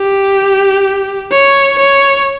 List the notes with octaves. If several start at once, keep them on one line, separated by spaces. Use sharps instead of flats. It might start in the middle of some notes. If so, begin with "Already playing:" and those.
Already playing: G4
C#5
C#5